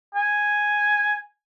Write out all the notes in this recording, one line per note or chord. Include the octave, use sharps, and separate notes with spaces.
G#5